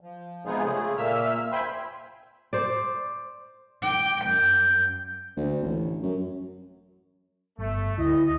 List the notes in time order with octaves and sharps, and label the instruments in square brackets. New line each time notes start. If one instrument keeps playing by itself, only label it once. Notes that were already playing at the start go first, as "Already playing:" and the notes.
[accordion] F3
C3 G#3 B3 D#4 F4 G#4
C#3 A3 G#4
A#2 A#3 E5 E6 F6
C5 E5 G5 G#5 B5 C6
[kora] C5 D5
[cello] G5 [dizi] D6
[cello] F#2 [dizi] G6
[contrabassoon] D2
A1
F#2
[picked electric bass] G1 [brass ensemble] A3
[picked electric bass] D2 [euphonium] E4 [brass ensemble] D#5